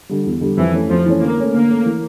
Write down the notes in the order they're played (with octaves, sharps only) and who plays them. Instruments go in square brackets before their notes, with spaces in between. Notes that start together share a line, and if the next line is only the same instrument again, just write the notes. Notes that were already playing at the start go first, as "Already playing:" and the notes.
[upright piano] D3 G3
E2
D3 G3
[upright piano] F2 [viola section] E3
[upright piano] E3 A3 C#4
[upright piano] F2 [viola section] F3
[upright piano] E3 A3 C#4
[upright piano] D3 [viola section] A#3
[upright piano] A3 C#4
[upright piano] D3 [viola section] A#3
[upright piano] A3 C#4
E3